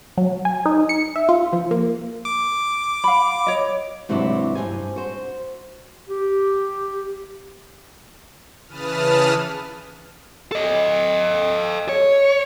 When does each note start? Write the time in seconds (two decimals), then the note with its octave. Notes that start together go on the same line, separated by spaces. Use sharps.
0.17 F#3
0.45 G#5
0.66 D#4
0.89 C#7
1.16 E5
1.29 F4
1.53 F3
1.71 A#3
2.25 D6
3.04 F5 B5
3.47 C#5 D#5
4.09 G#2 C3 E3 F#3 D4 E4
4.55 G2 D#3 C5 G#5
4.96 F#4 C5
6.08 G4
8.68 C#3 E3 B4 A5 D#6 F6
10.52 A4 D#5
11.89 C#5